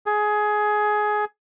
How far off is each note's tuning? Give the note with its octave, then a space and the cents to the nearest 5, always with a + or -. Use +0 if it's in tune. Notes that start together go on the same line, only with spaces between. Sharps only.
G#4 +15